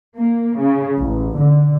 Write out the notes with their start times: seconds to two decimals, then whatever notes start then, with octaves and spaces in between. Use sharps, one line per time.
0.18 A#3
0.59 C#3
0.99 A1
1.38 D3